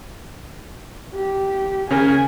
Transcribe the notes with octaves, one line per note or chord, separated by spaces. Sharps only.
G4
C#3 C#4 G#4 A#4 G#5